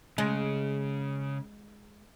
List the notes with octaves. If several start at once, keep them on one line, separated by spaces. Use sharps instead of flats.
C#3 G#3